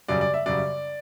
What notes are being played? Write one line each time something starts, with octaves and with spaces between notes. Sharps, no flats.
F#2 C#3 G3 D5
D5
E5
F#2 C#3 G3 D5